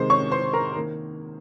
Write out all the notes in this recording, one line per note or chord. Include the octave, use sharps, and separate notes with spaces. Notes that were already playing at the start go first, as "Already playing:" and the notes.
Already playing: C3 D#3 G#3 C5
C#5 C#6
C5 C6
A#4 A#5
D#3 A#3